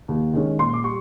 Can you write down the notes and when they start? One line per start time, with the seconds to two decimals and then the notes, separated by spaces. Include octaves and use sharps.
0.08 D#2
0.33 D#3 G#3 C#4
0.59 A#2 C6
0.74 D6
0.84 G3 C#6